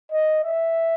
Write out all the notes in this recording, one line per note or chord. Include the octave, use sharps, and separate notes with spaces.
D#5
E5